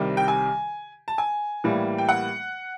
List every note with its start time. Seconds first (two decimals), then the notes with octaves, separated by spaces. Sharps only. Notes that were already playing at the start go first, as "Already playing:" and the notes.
Already playing: C2 C3 D#3 G3
0.17 G5
0.28 G#5
1.08 A5
1.18 G#5
1.64 A2 E3 G3 A#3
1.98 G5
2.09 F#5